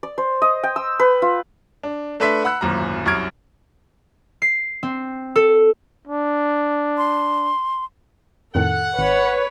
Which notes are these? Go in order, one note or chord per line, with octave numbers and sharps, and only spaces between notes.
D5
C5
D#5
G5
E6
B4
F4
D4
A3 D4 B4 E5 C6 B6
F#5 B5 E6 F#6
D1 G#1 F#2 A#2 A#5
C2 F#2 C#6 F6 G#6 D7
C7
C4
A4
D4
C6
F2 A2 D#3 A4 F#5
G#1 B4 C#5